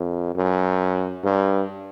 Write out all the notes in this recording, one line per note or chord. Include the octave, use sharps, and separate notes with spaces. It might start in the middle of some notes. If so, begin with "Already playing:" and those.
Already playing: F2
F#2
G2